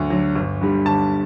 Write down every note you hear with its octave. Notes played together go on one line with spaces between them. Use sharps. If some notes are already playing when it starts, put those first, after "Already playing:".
Already playing: D2 D3 F#3
D3 F#3
G1
G2 D3 G3
G1 A5